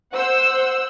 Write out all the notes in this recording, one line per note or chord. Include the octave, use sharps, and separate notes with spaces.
C5 F#5 E6